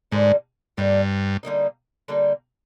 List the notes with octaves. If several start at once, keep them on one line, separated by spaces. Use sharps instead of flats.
G#2 D3 G3 A#3 D#4
G2 D3 G3 A#3 D#4
D3 G3 A#3 D#4
D3 G3 A#3 D#4